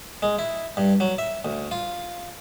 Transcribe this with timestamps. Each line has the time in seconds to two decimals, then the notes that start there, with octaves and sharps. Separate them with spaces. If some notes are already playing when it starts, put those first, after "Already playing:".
0.23 G#3
0.39 E4
0.77 G2
1.00 F#3
1.18 E5
1.45 D2
1.71 F4